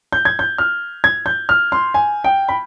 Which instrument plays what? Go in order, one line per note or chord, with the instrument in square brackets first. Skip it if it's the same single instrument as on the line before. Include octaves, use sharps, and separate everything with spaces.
[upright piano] G6
G#6
G6
F6
G#6
G6
F6
C6
G#5
G5
B5